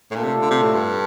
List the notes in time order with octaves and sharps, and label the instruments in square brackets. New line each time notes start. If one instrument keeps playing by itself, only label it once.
[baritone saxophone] A2
[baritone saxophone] A#2 [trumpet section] A3 D4 F4 A4
[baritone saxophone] C3
D3
C3
A2
G2